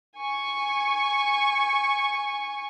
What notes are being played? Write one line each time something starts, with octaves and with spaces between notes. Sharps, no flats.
G#5 C#6